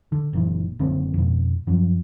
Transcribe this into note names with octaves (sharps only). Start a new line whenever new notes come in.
D3
F#1 A#2 E3
F#1 D3 A#3 C4
F2 B2
F#2 F3